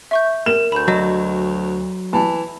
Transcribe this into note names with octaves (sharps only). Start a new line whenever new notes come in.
E5 C#6 G6
A#4 E7
D2 B5 G6
F#3 D#5
E3 A5